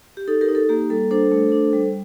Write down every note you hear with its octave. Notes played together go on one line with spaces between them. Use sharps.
G4
D#4 A4
G4 A#4
D#4
A4
A#3 G4
G3 A4
D4 A4 C5
A3
D4
G3